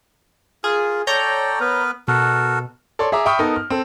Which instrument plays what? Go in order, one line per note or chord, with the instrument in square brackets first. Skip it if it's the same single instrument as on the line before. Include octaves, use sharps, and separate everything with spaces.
[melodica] F4 A#4 [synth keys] G#4
[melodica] A4 D5 G5 [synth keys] C#5 A#5 G6
[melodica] B3 A#4 B4
[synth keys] B2 [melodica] F#4 A4 A#4
[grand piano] A4 C#5 D5 C6
G#4 E5 A#5 D6
E5 G5 B5 C#6 D#6 F6
B3 D#4 A4 A#4
F6
C4 A4